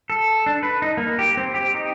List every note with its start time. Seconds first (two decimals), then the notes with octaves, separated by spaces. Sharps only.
0.10 A4
0.46 D4
0.63 B4
0.82 D#4
0.97 A#3
1.19 G4
1.37 C4
1.54 G4
1.74 D#4